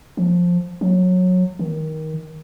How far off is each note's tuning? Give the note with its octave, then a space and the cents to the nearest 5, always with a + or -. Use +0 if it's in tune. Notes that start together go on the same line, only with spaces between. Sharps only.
F3 +10
F#3 -20
D#3 +15